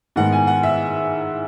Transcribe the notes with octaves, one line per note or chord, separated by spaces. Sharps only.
G#2 D#3 G#3 B3 F#5
G#5
F#5
E5